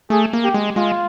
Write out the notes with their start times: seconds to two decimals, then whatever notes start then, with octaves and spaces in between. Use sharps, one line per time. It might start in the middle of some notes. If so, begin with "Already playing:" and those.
0.10 A3 G#4
0.33 A#3
0.44 G4
0.54 G#3
0.76 G#3 F4